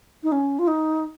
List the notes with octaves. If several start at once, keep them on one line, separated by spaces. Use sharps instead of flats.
D#4
C#4
F4
D#4